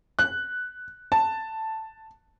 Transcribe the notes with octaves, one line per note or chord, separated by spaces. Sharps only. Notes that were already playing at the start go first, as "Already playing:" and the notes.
F#6
A5